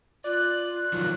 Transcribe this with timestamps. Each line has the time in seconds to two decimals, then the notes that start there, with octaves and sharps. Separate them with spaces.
0.24 F4 D5 F#6
0.93 D#3 F3 F#3